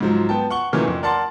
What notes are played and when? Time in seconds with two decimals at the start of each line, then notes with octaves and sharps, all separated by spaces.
0.01 G#2 F3 F#3
0.29 B3 G5 A5
0.50 F#5 C#6 G7
0.72 A#2 D#3 E3 F#3 A3 C#4
0.88 F2
1.03 A#4 D5 F#5 A5 C6 A6